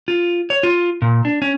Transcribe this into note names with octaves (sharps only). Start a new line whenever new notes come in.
F4
C#5
F4
A#2
D4
C#4